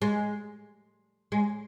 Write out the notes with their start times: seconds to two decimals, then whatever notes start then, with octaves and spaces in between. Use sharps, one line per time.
0.02 G#3
1.32 G#3